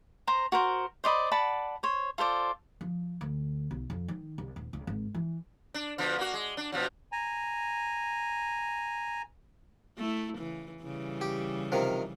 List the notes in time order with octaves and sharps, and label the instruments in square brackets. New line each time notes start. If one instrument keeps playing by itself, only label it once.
[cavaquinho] C5 A#5
F#4 A#4 C5
C5 D5 D#5 B5
D5 F#5 A5 B5
C5 C#5
F4 A4 C5 D5
[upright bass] F3
D2
B1
F2
D#3
C2
D#1
C#2
G#1
E3
[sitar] D4
B2 D3 F3
A#3 F#4
G#3
D4
B2 F3 F#3
[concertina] G#5 A#5
[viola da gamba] A3 E4
C#3 E3
C#3 E3 G3
[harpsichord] G4
C3 D#3 F3